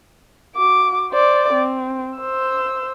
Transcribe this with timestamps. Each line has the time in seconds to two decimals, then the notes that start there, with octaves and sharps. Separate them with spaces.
0.57 F#4 D6
1.11 C5 D5
1.53 C4
2.18 C5 E6